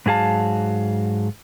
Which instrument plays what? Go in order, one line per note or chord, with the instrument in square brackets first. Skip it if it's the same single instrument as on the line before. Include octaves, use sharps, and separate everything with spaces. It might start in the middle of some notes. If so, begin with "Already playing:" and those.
[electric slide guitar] G#2 F#3 G#4 F5 A5